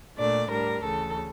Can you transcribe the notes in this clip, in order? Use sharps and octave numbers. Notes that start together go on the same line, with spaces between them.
A#2 A3 D4 D5
A2 G3 D4 A#4
D2 C#3 E3 A4